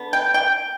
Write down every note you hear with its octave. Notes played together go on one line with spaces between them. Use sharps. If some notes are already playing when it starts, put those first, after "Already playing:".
Already playing: D3 B3
G5
G5